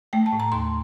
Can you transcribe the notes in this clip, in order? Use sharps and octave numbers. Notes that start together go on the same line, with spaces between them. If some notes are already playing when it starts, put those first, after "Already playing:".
A3 G5
A5
A2
A#5
D#2 C6